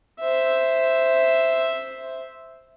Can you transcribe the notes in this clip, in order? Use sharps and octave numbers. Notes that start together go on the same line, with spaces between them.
C5 E5